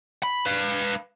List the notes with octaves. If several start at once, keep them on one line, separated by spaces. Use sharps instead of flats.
B5
B4 F5